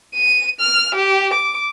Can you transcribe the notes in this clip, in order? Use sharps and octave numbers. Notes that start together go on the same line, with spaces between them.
D#7
F6
G4
D6